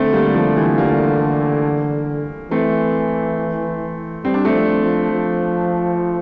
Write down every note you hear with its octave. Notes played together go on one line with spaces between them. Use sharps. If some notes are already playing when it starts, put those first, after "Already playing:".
Already playing: D3 A3 C4
G3 A#3
F3 A3
E3 G3
G3 A#3
E3 A3 C4
G3 C4
D4
A3 C4
F3
F3
F3